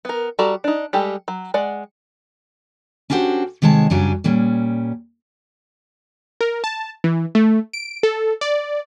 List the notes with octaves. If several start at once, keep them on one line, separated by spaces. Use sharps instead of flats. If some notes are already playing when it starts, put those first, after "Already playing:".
B3 A#4
G3 F#4 A4 D5 A#5
D4 D#4
G3 G#3 G4 A4
F#3
G#3 D5 F#5
C#4 D4 F#4 G4 A#4 C5
C3 D#3 G#3 C#5 A5
F#2 C#3 F#3 G3 D4 G#5
A#2 G3 C#4
A#4
A5
E3
A3
D7
A4
D5